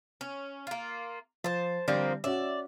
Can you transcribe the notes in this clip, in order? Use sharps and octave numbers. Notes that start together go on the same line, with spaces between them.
C#4
A#3 F4
F3 C5 A5
D3 F3 G3 A#3 C4
C#4 F#4 D5 E5